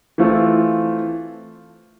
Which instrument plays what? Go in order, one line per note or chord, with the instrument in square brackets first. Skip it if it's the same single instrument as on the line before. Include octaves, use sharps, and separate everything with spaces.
[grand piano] E3 A3 C4 F4